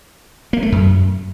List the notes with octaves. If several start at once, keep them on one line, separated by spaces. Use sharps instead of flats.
A#3
A3
F#2